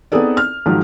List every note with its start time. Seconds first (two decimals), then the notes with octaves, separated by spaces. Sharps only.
0.12 B3 C4 D#4 G#4 A4 D5
0.37 F6
0.66 G#2 D#3 F3 F#3